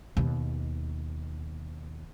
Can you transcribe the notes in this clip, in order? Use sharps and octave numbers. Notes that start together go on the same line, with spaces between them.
D#2 B2